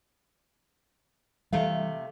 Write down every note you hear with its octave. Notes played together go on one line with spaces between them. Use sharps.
C3 E3 G3 A3 F5